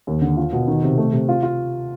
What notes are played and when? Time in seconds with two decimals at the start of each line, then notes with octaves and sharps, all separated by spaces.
0.07 D#2
0.21 D3
0.37 F4
0.53 B2
0.68 D#3
0.83 C3
0.98 A3
1.13 C3
1.29 F4
1.43 F4